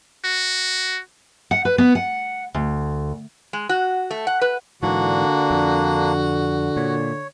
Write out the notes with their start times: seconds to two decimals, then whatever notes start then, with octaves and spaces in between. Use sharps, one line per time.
0.25 F#4
1.51 F#5
1.65 B4
1.78 B3
1.95 F#5
2.54 D2
3.53 G#3
3.69 F#4
4.11 A3
4.27 F#5
4.41 B4
4.83 G#2 D3 E3 A#3 D4 F#4
5.51 F2
6.76 A#2 C#5